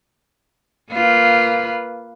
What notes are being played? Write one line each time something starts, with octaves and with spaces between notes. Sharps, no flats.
A#3 F4 B4